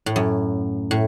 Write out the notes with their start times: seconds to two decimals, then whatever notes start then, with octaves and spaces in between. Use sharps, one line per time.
0.06 A2
0.16 F#2
0.91 A2